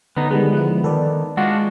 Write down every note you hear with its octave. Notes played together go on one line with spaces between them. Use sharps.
D3 B3 D#4
D#3 G3 G#3 B3
F3 G#3 E4
D#3 A4 B4 D5
G#3 D4 F4 F#4 F#5